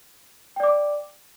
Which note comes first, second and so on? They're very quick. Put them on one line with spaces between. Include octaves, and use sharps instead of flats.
G5 D5 D6